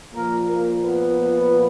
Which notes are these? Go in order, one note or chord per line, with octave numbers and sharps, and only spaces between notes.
A#2 F3 A#3 A#4
A#3 A#4
B3 B4